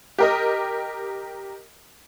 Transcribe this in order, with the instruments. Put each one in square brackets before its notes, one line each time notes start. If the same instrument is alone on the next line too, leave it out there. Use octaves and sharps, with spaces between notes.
[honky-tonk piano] G4 A#4 D#5